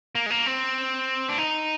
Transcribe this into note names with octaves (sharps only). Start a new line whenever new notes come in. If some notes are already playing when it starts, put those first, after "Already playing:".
A#3
G#3
A#3
C4
D4
D#4